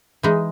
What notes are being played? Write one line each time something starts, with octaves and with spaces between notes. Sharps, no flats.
E3 G#3 D#4